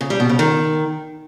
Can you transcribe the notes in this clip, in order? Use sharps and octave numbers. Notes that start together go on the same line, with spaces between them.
C#3
G3
B2
C#3
D#3